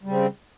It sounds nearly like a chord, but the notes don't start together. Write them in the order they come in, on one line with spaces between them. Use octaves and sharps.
G3 C#3 C4